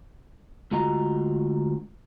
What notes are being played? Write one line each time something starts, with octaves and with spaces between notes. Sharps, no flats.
D2 G#3 F4 F#4 D#5 A#5